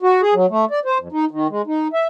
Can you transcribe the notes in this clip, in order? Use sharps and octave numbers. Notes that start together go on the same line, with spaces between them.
F#4
G#4
F#3
A3
D5
C5
F2
D#4
D#3
G#3
D#4
E5